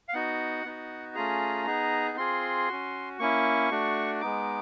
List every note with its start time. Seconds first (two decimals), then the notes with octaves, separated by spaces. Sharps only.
0.08 F5
0.13 B3 D#4 F#4 F#5
0.65 B3 D#4 F#4
1.15 A3 C#4 F4 G#4 A#5
1.66 B3 D#4 G#4
2.17 C4 F4 G#4 C6
2.68 C#4 F#4
3.19 A#3 C#4 E4 C#6
3.71 A3 D4 F#4
4.21 G#3 B3 D#4 D6